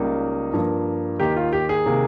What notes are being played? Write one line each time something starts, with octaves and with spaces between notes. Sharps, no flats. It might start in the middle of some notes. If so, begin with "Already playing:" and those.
Already playing: C#2 C#3 G3 A#3 D#4
G2 F3 A#3
D#2 D#3 A#3 G4
F4
G4
G#4
C3 D#3 A#3